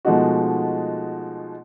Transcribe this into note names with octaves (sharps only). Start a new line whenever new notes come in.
B2 F3 G#3 A3 D#4 F#4